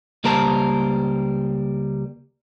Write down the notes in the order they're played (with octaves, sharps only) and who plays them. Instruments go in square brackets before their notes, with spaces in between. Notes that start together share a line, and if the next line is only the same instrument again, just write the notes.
[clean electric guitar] C#2 G3 A#3 A#4 C5 A5